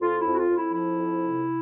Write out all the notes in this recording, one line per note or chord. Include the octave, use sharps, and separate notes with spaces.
F2 F4
E4
F2
F#4
F4
F2
E4
F3 E4
F2
C3